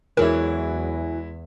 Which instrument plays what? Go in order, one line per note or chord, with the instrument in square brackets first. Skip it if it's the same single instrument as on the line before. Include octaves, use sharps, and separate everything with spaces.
[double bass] E2 [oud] E3 F#3 [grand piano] G#3 E4 [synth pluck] A#4